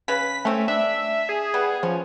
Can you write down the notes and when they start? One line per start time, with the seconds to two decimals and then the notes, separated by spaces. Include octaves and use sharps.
0.08 C#3 B4 B6
0.45 A3 C4 C#4
0.68 D4 E5
1.29 G#4
1.54 G3 B3
1.83 F3 C#4